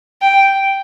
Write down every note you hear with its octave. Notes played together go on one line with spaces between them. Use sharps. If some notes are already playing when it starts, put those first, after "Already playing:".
G5